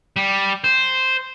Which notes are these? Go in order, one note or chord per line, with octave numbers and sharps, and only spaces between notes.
G3
C5